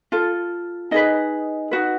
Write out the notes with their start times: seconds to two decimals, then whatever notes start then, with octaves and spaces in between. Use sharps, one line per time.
0.12 F4 A4
0.91 D#4 G#4 B4 D#5
1.71 D#4 F#4 B4